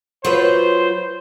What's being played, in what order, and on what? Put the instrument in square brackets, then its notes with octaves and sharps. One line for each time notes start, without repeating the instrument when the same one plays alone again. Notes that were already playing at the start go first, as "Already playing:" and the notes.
[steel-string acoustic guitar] F#3 F4 B4 [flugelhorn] C5